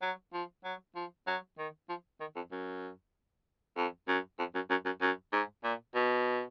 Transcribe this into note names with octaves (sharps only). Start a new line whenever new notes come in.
F#3
F3
F#3
F3
F#3
D#3
F3
D#3
F2
F#2
F2
F#2
F2
F#2
F#2
F#2
F#2
G#2
A#2
B2